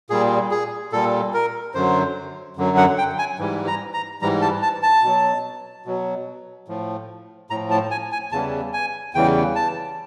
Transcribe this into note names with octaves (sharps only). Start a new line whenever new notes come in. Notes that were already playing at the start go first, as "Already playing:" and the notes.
A#2 G3 G#4
G#4
A#2 G3 A4
A#4
F#2 D3 F#3 C5
F#2 D3 F#3
F#5
G5
G#5
G#2 E3 G3
A#5
A#5
G#2 E3 G3 A#5
A5
A5
A5
B2 F#3
B2 F#3
A2 F3
A2 F3 A#5
A5
G#5
G#5
E2 C#3 E3 G3 A5
G#5
E2 C#3 E3 G3 G5
A5